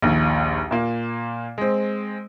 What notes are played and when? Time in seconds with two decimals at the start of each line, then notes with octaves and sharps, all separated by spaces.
0.02 A#1 D#2
0.71 A#2 A#3
1.58 G#3 C4